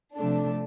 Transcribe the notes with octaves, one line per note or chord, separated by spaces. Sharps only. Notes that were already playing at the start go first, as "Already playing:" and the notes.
C3 F3 A3 D4